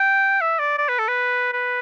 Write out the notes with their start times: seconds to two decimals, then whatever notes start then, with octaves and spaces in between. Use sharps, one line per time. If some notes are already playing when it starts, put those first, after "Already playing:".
Already playing: G5
0.41 E5
0.59 D5
0.78 D5
0.89 B4
0.99 A4
1.08 B4
1.53 B4